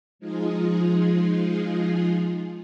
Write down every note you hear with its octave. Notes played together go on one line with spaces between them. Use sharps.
F3 G#3 D#4 F4 G#4